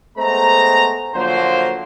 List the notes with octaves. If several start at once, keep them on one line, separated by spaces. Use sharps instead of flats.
G#3 A3 B3 C5 A#5
D3 F3 F#3 A#3 C5